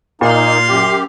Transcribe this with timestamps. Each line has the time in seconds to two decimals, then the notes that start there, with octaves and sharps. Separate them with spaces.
0.21 A#2 A#3 D#4 F5 C6
0.68 F#2 G4